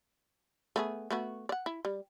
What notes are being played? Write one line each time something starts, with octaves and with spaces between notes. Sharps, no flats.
A3 B3 G#4
A3 B3 F#4
D5 F#5
E4
G3